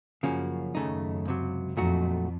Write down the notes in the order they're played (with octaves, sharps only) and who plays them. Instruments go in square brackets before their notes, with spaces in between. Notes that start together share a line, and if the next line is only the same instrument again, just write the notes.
[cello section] F#2 [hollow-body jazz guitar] C#3 F3 A#3 C#4 F#4
[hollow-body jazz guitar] D#2 C#3 A3 D#4
C#2 C3 F#3
[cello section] F2 [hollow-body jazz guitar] A#2 F#3 A3 D#4 F#4